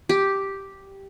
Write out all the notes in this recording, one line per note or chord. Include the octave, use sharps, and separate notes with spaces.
G4